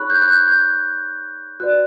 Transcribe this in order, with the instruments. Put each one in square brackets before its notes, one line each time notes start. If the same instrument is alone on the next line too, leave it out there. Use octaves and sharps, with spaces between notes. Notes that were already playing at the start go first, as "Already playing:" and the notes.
Already playing: [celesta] D#4 G#4 C#5 B5 C#6 F#6
G6
F#6
G6
G6
F#4 B4 D5 F#6